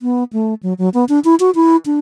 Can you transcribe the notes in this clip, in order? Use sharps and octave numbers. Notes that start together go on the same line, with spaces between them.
B3
A3
F#3
F#3
B3
D4
E4
F#4
E4
D4